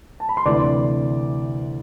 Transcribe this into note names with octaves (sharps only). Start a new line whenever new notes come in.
A5
B5
C6
D2 C3 E3 D5 D6